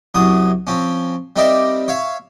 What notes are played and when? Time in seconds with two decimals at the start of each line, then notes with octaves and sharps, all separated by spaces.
0.14 C2 F#2 F#3 D#6
0.67 F3 C4 C#4
1.36 G3 C4 D#4 A#4 D5 E5
1.88 C#5 E5 F5